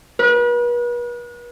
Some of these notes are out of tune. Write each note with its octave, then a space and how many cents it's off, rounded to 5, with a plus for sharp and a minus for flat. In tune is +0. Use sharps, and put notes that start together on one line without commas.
B4 -40